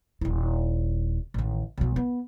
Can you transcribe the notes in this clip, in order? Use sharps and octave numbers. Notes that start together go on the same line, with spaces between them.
D#1 E4
A1 D#3
B1 F#3
B3